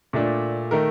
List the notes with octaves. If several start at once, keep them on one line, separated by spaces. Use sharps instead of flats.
A#2 A3 D4
D#3 A3 A#4